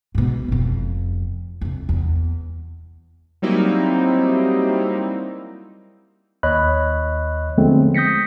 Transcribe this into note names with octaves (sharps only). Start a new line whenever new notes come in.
G#2 B2
F1 F2
F2 C3
E2
F#3 G3 A#3 C4 D#4 E4
D#2 C#5 D#5 B5 F#6
D3 F3 G#3 A3 B3 C4
D#6 G6 A#6 B6 C#7